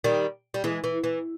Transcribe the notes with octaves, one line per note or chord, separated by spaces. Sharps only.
D#3 G3
G3
E3 G#3
E3
E3